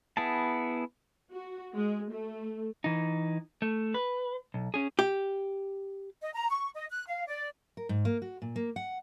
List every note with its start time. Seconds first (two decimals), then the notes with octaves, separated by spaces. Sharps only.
0.17 B3 E4 G#4 A5
1.32 F#4
1.75 G#3
2.11 A3
2.84 E3 D#4
3.62 A3
3.94 B4
4.54 B1
4.74 C#4 G#4
4.99 G4
6.21 D#5
6.34 A#5
6.50 C#6
6.74 D#5
6.91 F#6
7.07 F5
7.27 D5
7.77 A#4
7.89 G#2
8.05 A#3
8.22 F#4
8.42 A#2
8.56 A#3
8.76 F#5